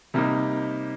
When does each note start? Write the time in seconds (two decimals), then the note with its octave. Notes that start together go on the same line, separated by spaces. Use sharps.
0.14 C3 G3 A#3 D#4